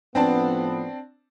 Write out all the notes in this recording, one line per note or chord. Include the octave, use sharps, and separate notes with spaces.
A2 F3 B3 C4 D4 A5